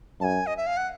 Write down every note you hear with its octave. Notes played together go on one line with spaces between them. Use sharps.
F#2 G#5 A5
D#5
E5
F5
F#5